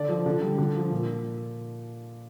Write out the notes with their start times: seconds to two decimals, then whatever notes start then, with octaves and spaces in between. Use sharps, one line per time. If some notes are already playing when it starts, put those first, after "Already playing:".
Already playing: D3 D5
0.09 F3
0.26 D3
0.42 G3
0.58 D3
0.75 F3
0.91 A#2